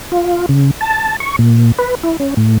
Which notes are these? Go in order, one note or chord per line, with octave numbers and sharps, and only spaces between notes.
F4
C#3
A5
C#6
A#2
B4
E4
C#4
A2